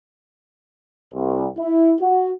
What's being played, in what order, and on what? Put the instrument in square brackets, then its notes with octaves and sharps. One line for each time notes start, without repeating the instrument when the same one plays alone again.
[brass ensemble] C2
E4
F#4